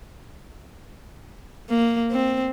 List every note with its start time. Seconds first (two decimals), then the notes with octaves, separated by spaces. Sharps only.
1.69 A#3
2.12 C4